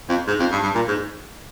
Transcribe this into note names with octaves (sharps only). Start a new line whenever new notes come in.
F2
G#2
F2
G2
G2
A#2
G#2